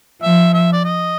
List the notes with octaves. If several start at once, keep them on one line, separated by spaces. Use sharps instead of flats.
F3 E5
E5
D5
D#5